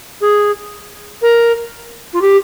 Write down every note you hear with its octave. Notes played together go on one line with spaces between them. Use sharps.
G#4
A#4
F4
G4